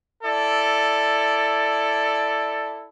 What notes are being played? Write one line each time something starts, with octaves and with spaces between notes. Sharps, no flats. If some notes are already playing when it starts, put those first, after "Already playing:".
E4 A4 D5